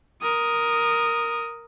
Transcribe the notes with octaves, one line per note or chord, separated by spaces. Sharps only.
A#4 D#6